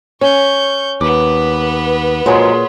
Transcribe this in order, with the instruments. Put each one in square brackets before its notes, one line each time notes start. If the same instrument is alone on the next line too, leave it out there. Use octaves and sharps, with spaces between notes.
[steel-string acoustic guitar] C#4 [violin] C#6 G6
[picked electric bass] D#2 [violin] B3 B4 [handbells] D6
[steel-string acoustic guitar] F2 F#3 G#3 [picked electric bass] A#2 [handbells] G#4 C#5 C6